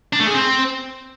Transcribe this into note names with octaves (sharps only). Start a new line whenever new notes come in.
D4
A3
G#4
C4